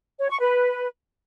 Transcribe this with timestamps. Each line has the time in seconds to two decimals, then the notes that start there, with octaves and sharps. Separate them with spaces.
0.19 C#5
0.30 C#6
0.40 B4